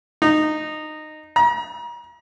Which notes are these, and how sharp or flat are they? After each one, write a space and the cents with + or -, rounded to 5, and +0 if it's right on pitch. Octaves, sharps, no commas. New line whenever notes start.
D#4 -15
A#5 +40